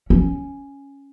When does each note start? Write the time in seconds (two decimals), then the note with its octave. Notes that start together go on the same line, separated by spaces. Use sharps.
0.10 C#4